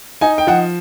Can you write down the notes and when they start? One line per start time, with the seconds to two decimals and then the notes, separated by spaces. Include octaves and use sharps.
0.21 D#4 G#5
0.38 G5
0.47 F3 F#5